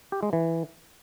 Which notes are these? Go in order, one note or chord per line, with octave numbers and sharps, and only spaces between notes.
G4
G#3
E3